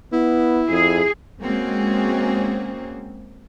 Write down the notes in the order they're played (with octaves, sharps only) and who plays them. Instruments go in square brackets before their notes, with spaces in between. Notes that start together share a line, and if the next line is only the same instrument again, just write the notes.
[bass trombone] B3 [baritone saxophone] E4
[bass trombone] F2 [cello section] G#4
[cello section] G#3 A#3 C4 C#4 F#4 G#4